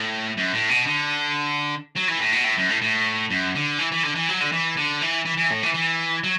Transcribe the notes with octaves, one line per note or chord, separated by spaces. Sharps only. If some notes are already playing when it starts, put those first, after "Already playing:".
Already playing: A2
F#2
A2
B2
D3
F#3
E3
A2
B2
A2
F#2
A2
A2
F#2
D3
E3
E3
D3
E3
F#3
D3
E3
D3
E3
E3
E3
A2
E3
E3
F#3